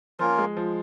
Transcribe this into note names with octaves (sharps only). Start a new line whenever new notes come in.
F3 A#3 C#4 F4 A#4
G#3
F3